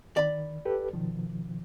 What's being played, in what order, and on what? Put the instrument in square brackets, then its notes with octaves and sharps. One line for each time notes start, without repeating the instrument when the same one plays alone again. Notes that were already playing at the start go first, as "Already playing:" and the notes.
[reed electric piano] D#3 [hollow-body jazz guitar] D5 B5
[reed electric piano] G4 A4 B4
B2 D#3 F3